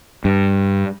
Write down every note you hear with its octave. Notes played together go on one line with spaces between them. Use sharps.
G2